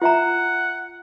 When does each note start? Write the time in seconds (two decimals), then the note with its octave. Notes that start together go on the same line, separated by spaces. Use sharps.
0.02 F4 E5 F#5 A#5